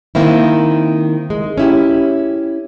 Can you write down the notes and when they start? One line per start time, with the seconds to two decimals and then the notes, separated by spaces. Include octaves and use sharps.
0.15 D#3 A#3 C4 E4
1.30 G#3
1.58 C#4 E4 G4